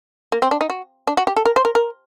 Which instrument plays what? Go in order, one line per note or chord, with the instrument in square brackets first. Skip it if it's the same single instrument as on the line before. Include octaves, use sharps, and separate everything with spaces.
[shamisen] A#3
C4
D4
D#4
F#4
D4
F#4
G4
A4
A#4
C5
A#4
A#4